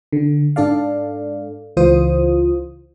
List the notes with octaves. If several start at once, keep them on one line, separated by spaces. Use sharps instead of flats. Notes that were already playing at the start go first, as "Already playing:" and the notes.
D3
G#2 D4 A4 D5 F5
C#2 E3 F4 C5 D#6